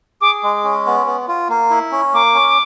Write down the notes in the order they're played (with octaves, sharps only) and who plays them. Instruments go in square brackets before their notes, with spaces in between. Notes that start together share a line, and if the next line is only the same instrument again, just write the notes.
[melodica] G#4 [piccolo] D6
[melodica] G#3
C#4
B3
B3
F4
A#3
E4
C#4
[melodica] A#3 [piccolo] D6
[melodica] C#4